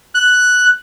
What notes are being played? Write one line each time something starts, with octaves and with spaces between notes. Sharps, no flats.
F#6